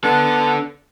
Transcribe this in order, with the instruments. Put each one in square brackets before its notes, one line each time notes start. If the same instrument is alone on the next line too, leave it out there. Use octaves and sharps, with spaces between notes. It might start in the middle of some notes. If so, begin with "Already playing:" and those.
[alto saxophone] B3 [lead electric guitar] D4 A4